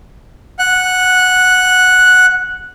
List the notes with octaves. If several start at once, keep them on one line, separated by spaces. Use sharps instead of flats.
F#5 F#6